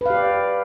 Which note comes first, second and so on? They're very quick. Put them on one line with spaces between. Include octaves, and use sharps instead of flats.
B4 F5 G4 D5